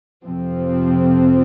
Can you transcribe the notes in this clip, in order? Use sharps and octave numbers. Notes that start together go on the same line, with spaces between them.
F2 C3 F3 C4